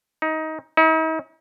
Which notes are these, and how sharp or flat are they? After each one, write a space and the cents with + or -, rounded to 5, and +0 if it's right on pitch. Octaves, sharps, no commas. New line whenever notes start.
D#4 +20
D#4 +45